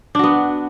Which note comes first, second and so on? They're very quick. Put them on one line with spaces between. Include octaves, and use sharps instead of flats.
D4 F#4 B3